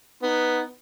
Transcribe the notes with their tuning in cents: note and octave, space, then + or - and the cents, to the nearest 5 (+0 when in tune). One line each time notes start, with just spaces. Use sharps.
B3 +0 D#4 +0